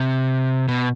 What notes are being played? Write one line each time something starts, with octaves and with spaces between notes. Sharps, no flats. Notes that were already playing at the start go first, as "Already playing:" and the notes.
Already playing: C3
B2